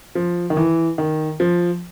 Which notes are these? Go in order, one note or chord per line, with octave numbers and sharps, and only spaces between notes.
F3
D#3
E3
D#3
F3